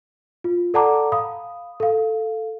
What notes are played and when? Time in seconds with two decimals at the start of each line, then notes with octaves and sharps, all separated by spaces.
0.44 F4
0.74 A4 D5 F#5 A5 A#5 D6
1.12 F5 B5 D#6
1.80 A4 F5